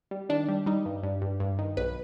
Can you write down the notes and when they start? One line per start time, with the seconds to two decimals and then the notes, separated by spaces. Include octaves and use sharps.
0.11 G3
0.29 D#3 D4
0.49 G3
0.66 G3 D#4
0.85 G2
1.03 G2
1.22 G2
1.40 G2
1.59 D#3
1.77 B1 B4